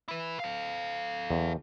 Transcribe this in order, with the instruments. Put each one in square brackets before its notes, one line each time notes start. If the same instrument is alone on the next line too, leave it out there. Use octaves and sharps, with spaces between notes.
[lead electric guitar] E4 B4
A4 F5
[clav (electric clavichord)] E2